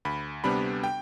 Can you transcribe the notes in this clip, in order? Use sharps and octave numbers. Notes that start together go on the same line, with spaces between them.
D2 B5
C3 G3 B3 D4 B5
G5